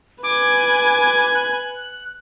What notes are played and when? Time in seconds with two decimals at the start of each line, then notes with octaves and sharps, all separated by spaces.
0.23 B4 G#5 D6
1.35 F#6